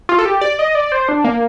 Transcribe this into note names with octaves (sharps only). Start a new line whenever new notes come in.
F4
A4
G4
D5
D#5
D5
C5
D4
A#3